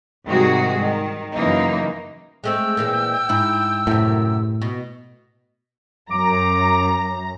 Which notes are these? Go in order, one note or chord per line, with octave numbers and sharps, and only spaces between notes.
G#2 C3 D#3 G3 F#4 G#4
D#3
F#2 C#3 E3 A#3 D#4
G#3 A3 C4 G5 E6
A#2 E3 G#3
G#2 E4
F#2 A2 C3
B2
F#2 A#5 D6